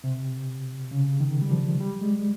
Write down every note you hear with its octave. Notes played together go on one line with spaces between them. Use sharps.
C3
C#3
D#3
G3
F3
G3
G#3